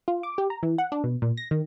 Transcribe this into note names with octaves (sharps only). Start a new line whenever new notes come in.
F4
D6
G4
A#5
E3
F#5
D4
B2
A#2
A#6
D#3